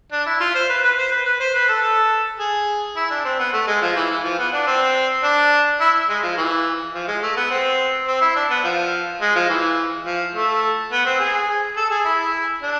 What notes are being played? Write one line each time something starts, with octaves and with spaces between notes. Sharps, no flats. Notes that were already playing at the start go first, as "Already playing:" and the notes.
D4
E4
F4
C5
B4
B4
C5
B4
B4
C5
B4
A4
A4
G#4
E4
D4
C4
B3
A3
G#3
F3
E3
E3
F3
B3
D4
C4
D4
E4
G#3
F3
E3
F3
G#3
A3
B3
C4
C4
E4
D4
B3
F3
G#3
F3
E3
F3
A3
B3
C4
G#4
A4
G#4
E4
D4